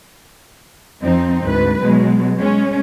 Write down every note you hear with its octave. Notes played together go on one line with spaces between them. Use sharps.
F2 F3 C4 D#4
D2 G#2 B4
B2 F#3 G#3
G#3 C#4